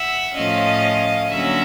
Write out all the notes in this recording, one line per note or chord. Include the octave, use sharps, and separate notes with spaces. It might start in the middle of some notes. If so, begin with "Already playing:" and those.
Already playing: E5 F#5
A2 F3 A3 C#4 D#5 F5
D3 F#3 A#3 C#4 E5 F#5